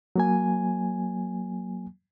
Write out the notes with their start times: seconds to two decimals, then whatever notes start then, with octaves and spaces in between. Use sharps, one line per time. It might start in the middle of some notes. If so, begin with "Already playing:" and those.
0.16 F#3 A#3 G#5